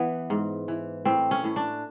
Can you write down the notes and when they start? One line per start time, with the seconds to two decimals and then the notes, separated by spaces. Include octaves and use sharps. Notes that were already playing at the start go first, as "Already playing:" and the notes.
Already playing: E3 B3
0.30 G#2
0.68 E3
1.05 A2 C4
1.31 C#4
1.44 A2
1.56 D4